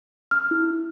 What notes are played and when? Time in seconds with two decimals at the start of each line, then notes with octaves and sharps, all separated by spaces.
0.31 F6
0.51 E4